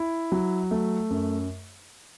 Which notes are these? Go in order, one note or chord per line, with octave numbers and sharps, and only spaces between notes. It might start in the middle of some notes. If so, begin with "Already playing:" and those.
Already playing: E4
F#3
A3
F#2